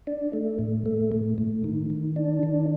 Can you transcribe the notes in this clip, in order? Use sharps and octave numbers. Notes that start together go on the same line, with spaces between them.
D4
A3
A2
A3
A2
A2
D#3
D#3
D4
D#3